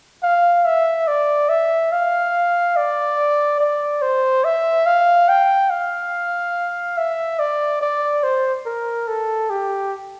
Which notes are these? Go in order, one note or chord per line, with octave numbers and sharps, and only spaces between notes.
F5
E5
D5
E5
F5
D5
D5
C5
E5
F5
G5
F5
E5
D5
D5
C5
A#4
A4
G4